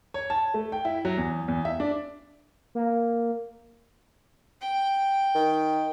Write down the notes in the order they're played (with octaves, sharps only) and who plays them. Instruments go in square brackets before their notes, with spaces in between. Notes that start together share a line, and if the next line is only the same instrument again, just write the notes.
[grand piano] C#5
A5
A3
G5
E4
F#3
E2
E2
E5
D4
[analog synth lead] A#3
[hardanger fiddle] G5
[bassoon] D#3